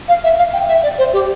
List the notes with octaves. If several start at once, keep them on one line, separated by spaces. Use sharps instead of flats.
F5
E5
F5
G5
E5
D5
C5
G4